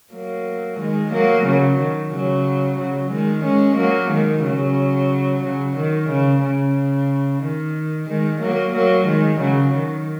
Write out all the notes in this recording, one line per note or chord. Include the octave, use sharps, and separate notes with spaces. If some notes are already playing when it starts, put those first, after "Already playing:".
F#3 A#3
D#3 G#3
F#3 A#3
C#3 F#3
D#3
C#3 F#3
C#3 F#3
D#3 G#3
G#3 C#4
F#3 A#3
D#3 G#3
C#3 F#3
C#3 F#3
D#3
C#3
C#3
D#3
D#3 G#3
F#3 A#3
F#3 A#3
D#3 G#3
C#3 F#3
D#3